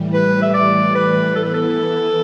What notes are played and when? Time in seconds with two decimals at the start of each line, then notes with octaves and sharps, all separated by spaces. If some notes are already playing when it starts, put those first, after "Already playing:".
Already playing: A2 E3 G3
0.14 B4
0.42 E5
0.54 D5
0.95 B4
1.35 E3 B3 E4 A4
1.45 B4
1.54 A4